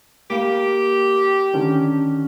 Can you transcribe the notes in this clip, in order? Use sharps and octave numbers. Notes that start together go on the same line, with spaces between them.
A#3 G4 F5
D3 D#3 C#4